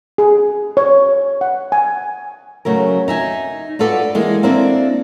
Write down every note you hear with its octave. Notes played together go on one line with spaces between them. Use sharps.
G#4
C#5
F#5
G#5
C#3 F#3 A3 A#4
D#4 E5 G#5
D4 F4 F#4 A4 B4 D5
E3 G#3 A#3
A#3 C4 D4 E4 A4